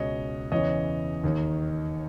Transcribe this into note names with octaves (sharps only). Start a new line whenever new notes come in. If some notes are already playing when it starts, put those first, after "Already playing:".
Already playing: C#2 B2 C#5 D#5
E2 C#3 E3 C#5 D#5
D#2 D#3